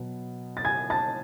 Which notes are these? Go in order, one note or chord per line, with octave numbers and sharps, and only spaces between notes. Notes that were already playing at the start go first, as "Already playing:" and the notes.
Already playing: B2 F#3 B3
A6
G#5 G#6
A5 A6